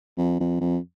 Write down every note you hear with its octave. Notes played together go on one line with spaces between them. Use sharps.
F2
F2
F2